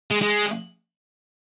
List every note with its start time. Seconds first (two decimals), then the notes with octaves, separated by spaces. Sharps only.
0.11 G#3
0.22 G#3